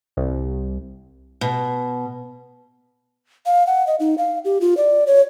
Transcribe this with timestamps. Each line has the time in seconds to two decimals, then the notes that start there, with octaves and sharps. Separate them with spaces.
0.17 C2
1.41 B2
3.46 F5
3.67 F#5
3.87 D#5
4.00 D#4
4.18 F5
4.45 G4
4.61 F4
4.77 D5
5.07 C#5